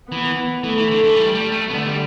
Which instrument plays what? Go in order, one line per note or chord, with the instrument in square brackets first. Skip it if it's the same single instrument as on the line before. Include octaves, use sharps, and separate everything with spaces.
[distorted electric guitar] E3 [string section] B3
[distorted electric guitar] E3 [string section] A3
[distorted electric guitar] E3
D3
E3
G3
G3
A3
[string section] D3 [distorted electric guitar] B3
[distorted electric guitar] A3
G3